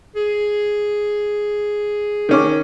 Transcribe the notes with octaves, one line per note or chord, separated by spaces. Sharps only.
G#4
D#3 C#4 D6